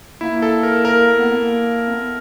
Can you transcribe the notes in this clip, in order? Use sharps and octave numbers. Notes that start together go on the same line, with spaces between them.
A#3 E4
A4
A#4
A#4
A#3
B3
A#3
C4
B3